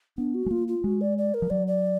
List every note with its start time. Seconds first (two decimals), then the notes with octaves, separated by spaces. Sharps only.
0.18 B3 D4
0.34 F#4
0.46 G#3
0.51 A#3 F4
0.68 F4
0.84 G#3 F#4
1.01 D5
1.18 D5
1.34 A#4
1.42 F3
1.50 F#3 D5
1.67 D5